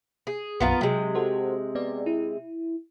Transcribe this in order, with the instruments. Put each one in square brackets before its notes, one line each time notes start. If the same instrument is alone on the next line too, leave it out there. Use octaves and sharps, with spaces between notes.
[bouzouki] G#4
[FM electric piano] B1 F#2 [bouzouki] B3 F4 A#4
[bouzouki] C3 G#3 [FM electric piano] F#3
[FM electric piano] F#4 A4 C5
B3 D5
E4